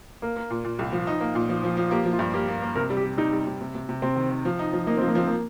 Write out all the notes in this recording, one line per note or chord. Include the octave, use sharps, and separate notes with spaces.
A#3 A#4
A#3
A#2
A#2
C2
F3
D#4
A#3
A#2
F3
F3
F3
A#3 G4
F3
F4
G2
A#3 G4
A#3
A#3
C3 A#4
G3
G4
G3
G3 D#4
G3
C3
C3
C3
C3
C3 C4
D#3
D#3
F3
D#4
F3
A#3 D#4
F3 C4
A#3
F3 C4
A#3